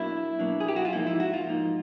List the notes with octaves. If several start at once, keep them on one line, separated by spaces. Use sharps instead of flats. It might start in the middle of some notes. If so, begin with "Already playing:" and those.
Already playing: B2 F#3 A#3 D4 E4
B2 F#3 A#3 D4
G#4
G4
F#4
F4
G#2 F3 A#3 D#4 E4
E4
F#4
F4
G#2 F3 A#3 D#4